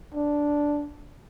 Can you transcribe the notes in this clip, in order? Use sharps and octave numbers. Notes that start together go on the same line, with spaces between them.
D4